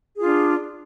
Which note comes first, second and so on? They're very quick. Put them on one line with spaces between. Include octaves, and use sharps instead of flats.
G#4 F4 D4